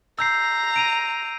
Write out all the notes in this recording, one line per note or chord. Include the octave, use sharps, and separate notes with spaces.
A#5 E6 G6 C7
D7 D#7 F7